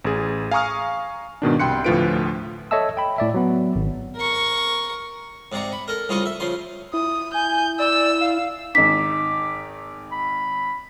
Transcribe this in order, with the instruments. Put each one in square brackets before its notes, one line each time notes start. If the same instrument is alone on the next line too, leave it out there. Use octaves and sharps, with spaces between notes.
[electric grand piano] A1 G#4
F5 G#5 A#5 C#6 D#6 F6
G#2 B2 D#3 D4
C2 G5 B5 C6 F#6 C#7
D2 A2 F3 F4 B4 D7
[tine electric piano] A4 C#5 D#5 E5 A5 E6
G5 B5
A2 D5 E5
F#3 B3
G#1
[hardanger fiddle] A#4 C#6
[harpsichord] G#2 C3 D5 A#5 C#6
B5
A4 A#4
C2 C#3 F4 D#5 C#6 D#6
E5
C#3 F3 C6
[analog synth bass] E4 [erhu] D#6
[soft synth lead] G#5 [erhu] G6
[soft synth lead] D5 [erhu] E6
[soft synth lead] F5
[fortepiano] G#1 D#4 [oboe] D6 [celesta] B6
[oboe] B5